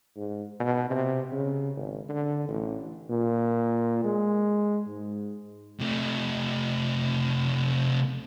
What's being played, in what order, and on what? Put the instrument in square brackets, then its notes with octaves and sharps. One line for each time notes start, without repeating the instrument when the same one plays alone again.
[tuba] G#2
B2
C3
C#3
G#1
D3
A1
[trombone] A#2
G#3
G#2
[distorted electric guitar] C3 A3